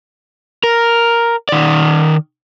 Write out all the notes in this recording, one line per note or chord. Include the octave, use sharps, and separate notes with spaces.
A#4
D#3 D5